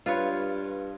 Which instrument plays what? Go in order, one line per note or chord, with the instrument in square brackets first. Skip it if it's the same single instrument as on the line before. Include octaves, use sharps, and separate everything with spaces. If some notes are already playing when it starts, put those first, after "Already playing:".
[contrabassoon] G2 [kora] F4 B4 C#5